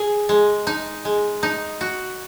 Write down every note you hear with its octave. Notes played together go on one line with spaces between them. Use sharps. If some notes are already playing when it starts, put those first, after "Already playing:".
Already playing: G#4
G#3
D#4
G#3
D#4
F#4